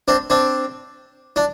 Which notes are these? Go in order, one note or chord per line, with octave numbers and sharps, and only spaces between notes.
C4 D4
C4 D4
D4